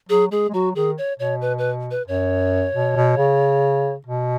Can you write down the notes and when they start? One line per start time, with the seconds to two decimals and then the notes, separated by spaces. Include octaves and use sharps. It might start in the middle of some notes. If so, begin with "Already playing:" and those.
0.09 F#3 G#4
0.31 G#3 G#4
0.49 G#3
0.54 F#3 F#4
0.75 D#3 G#4
0.98 C#5
1.19 B2 C#5
1.41 B4
1.58 B4
1.91 B4
2.08 F#2 C#5
2.74 B2
2.96 B2
3.18 C#3
4.06 B2